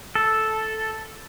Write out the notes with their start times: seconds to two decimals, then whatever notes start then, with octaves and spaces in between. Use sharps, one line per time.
0.15 A4